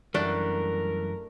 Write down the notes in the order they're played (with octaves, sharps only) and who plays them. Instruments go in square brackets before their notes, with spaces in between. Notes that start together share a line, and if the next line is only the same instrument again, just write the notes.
[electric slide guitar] F#2 E3 G3 [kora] A3 D4 F#5 [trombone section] A#4